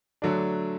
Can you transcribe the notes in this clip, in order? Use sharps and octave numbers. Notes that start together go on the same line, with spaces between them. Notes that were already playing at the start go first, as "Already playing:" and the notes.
D3 F#3 A3 D4